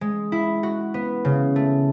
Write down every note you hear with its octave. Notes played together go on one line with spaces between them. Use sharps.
G#3
E4
F#4
B3
C#3
A3